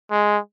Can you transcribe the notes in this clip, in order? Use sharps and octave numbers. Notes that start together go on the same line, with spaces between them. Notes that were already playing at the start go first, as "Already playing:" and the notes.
G#3